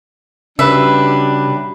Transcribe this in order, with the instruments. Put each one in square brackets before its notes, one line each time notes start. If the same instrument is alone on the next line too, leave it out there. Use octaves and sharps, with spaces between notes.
[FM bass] C#3 [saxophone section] F#3 G3 D4 [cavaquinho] B4 E5